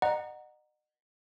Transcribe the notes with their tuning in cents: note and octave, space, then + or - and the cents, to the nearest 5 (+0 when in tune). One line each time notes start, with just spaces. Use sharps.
D#5 -35 F#5 +0 A#5 +5